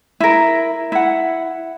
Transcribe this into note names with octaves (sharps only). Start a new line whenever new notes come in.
E4 A#4
E4 F#5